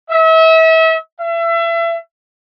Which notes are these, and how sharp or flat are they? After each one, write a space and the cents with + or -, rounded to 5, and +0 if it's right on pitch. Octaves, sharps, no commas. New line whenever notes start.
E5 -35
E5 +30